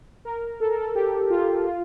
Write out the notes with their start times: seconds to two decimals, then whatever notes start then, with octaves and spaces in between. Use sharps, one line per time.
0.25 A#4
0.60 A4
0.70 A#4
0.79 A4
0.95 G4
1.30 F4
1.65 F4